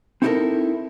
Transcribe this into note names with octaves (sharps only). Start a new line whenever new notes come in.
C4 D#4 E4 F#4 A4 A#4